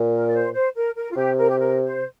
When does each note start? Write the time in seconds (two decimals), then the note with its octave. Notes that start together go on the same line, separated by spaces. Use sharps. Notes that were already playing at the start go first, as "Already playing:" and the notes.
Already playing: A#2
0.13 A#4
0.28 D5
0.34 C5
0.54 C5
0.75 A#4
0.96 A#4
1.11 F4
1.16 C3 G4
1.37 A#4
1.49 G4
1.58 A#4
1.85 C5